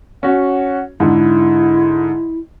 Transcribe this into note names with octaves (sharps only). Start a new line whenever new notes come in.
C#4 F#4 F#5
G#2 D3 E4